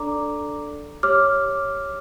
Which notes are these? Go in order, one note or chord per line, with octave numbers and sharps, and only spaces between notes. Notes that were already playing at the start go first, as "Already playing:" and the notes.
Already playing: D4 A4 D5 A#5 D6
G4 C#5 D6 F6